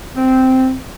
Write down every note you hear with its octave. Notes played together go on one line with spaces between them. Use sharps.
C4